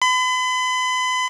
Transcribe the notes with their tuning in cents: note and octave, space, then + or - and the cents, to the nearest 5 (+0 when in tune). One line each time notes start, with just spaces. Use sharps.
B5 +40